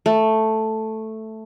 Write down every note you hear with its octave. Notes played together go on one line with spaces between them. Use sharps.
A3